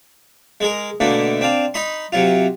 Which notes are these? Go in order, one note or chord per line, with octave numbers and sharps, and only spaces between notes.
G#3 G#4 A#4
B2 D3 A3 A#3 D4
C4 D4 F5
D#4 D#5 B5 C6
C3 F#3 F4